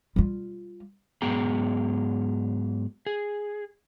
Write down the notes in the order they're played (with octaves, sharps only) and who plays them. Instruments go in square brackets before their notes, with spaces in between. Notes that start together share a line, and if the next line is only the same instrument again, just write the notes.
[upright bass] G3 F4
[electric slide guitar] G#2 F#3 B3 G#4 G5 A#5
G#4